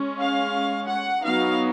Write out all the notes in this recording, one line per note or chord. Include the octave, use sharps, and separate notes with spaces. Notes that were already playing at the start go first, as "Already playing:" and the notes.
Already playing: G#3 C#4
F5
F#5
F#3 B3 D#4 F5